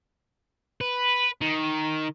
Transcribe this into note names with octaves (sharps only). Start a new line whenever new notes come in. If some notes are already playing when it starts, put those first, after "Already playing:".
B4
D#3